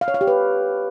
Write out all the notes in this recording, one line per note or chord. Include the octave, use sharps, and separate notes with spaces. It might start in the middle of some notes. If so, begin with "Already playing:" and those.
F5
C#5
F5
G4
B4